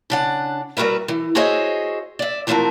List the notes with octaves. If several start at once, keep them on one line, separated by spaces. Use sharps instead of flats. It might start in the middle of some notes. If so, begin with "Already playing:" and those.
C#3 D4 F#5
G3 F#4 A#4 B4 E5
E3
F#4 G#4 C5 C#5 D#5 E5
D5 E5
E3 F3 A3 C4 F#4 A#4